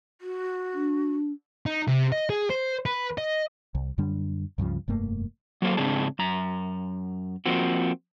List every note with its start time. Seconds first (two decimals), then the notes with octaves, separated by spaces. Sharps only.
0.21 F#4
0.74 D4
1.66 D#4
1.87 C3
2.12 D#5
2.30 G#4
2.50 C5
2.86 B4
3.18 D#5
3.75 C2
3.98 F#2 D3 G3 D4
4.58 C#2 G2 C#3 F3
4.88 F1 G2 A3 A#3
5.62 F#3 A#3 A4 C5 F5
5.77 G#2 C#3 C4 D4 G#4 A5
6.19 F#2 A#5
7.46 F3 A#3 C4 F#4